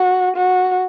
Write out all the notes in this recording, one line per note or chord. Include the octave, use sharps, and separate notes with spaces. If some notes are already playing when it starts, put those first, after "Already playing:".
Already playing: F#4
F#4